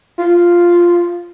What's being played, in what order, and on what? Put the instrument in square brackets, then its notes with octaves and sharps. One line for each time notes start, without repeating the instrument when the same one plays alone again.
[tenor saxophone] F4